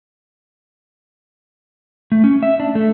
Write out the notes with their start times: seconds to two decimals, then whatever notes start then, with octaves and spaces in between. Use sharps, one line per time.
2.12 A3
2.24 C#4
2.43 E5
2.60 D4
2.75 A3